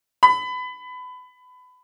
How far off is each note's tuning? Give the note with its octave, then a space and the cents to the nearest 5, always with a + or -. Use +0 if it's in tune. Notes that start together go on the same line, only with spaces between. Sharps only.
B5 +25